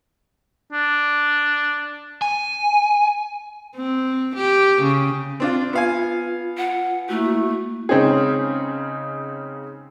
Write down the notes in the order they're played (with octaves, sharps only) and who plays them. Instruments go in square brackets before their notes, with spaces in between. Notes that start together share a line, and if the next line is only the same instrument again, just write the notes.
[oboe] D4
[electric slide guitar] G#5
[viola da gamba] C4
G4
C#3
[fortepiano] C4 D4 F4
[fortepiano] B3 F5 G#5 [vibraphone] F4
[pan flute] F#5
[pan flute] A3 [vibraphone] A#3 E4 F#4
[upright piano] C#3 G#3 C4 C#4 D#4 G#4